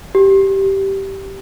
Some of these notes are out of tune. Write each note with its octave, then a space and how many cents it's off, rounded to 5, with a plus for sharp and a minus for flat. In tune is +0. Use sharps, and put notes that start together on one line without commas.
G4 -10